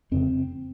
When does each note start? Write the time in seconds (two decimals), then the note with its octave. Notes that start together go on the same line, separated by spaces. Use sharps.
0.11 F2 C#3 C4